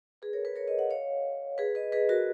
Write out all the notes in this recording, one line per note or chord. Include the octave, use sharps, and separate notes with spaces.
G#4 B4
A#4 C#5
G#4 B4
A#4 C#5
B4 D#5
D#5 F#5
C#5 F5
G#4 B4
B4 D#5
G#4 B4
F#4 A#4